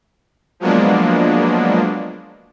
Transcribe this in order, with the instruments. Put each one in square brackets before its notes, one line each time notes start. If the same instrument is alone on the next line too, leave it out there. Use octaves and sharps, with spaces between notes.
[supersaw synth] F3 F#3 G#3 A#3 B3 D4